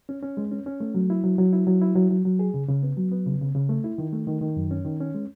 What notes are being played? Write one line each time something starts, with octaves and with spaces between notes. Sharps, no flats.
C#4
C#4
G#3
C#4
C#4
A3
F#3
E4
F#3
F#3
E4
F#3
E4
F#3
F#3
F#3
G#4
C#3
C#3
B3
F#3
B3
C#3
C#3
C#3
A3
E4
D#3
A3
D#3
D#3
F#2
C#4
D#3
C#4
G#3